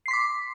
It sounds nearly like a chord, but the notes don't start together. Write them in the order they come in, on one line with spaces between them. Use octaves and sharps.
C7 C6 B6 D6